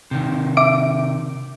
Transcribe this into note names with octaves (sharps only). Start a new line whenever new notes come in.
C3 D#3
E5 D6 D7